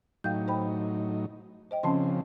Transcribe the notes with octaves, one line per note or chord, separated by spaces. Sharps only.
A2 F#3 D#4 F5 G5 G6
C5 G5 B5
C5 D#5 G5
C#3 F3 C4 C#4 A5 C6